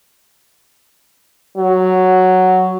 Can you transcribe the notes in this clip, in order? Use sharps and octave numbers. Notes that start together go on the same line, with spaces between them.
F#3